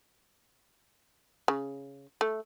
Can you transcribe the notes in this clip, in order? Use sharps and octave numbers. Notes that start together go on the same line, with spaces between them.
C#3
A3